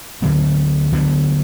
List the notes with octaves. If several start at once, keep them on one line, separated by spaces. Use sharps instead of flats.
D2 D3 F#3 B3
D2 D3 F#3 B3